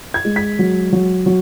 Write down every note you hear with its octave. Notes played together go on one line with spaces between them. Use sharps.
G#6
G#3
B6
F#3
F#3
F#3